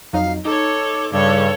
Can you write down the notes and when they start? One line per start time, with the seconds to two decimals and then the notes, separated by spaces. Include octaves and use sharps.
0.13 F2 F#3 D#4 F5
0.45 D#4 A4 C#5 D6
1.13 G2 C#3 G3 A4 C#5